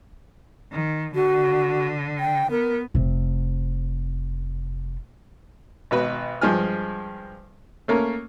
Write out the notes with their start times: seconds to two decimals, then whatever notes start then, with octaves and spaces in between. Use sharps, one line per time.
0.72 D#3
1.15 D3 F#4
2.20 G5
2.51 B3 A#4
2.95 F1 C3
5.91 G#1 B2 B4
6.41 G2 F3 G#3 G#5 F6
7.88 A3 A#3 C#4 A#4